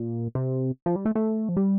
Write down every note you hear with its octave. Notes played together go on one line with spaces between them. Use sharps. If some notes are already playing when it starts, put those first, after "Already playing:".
Already playing: A#2
C3
F3
G3
A3
A3
F3
G3